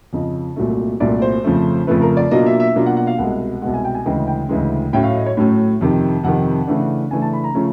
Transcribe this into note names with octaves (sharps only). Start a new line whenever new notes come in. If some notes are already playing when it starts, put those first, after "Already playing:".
F2 C#3 F3 D#5
C2 A#2 F#3 A3
C2 A#2 F#3 A3 D5
C5
F2 C#3 F3 A3
F2 C#3 F3 A3 B4
A#4
D5
B2 F#3 A#3 D4 F4 D#5
E5
E5
B2 F#3 A#3 D4 F4
F#5
F#5
F5
C2 B2 G#3 F#5
C2 B2 G#3 F#5
G#5
G5
G#5
D2 C#3 E3 G#3 G5
G5
D2 C#3 E3 G#3
A2 F#3 A3 C#4 G5
F5
D#5
C#5
A2 F#3 A3 C#4
F2 C3 D#3
F2 C3 D#3 F#5
C#3 E3 A3 D4
C#3 E3 A3 D4 G#5
A5
B5
A#5
C#3 F3 A3 C#4